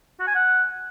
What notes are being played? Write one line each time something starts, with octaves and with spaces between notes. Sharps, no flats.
F#4
G#5
F#5